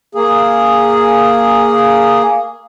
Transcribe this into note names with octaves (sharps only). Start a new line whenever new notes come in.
A#3 G#4